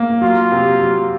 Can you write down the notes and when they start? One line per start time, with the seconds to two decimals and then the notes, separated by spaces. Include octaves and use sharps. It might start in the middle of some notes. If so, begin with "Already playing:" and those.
Already playing: A#3
0.21 F#3 F4
0.52 C3
0.81 F#3